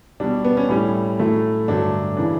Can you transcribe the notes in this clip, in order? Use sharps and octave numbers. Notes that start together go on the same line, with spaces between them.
B2 G3 D4
B3
C#4
A2 G3 C#4
A2 F#3 A3
G2 D3 F#3 A3 D4
C#3 E3 D4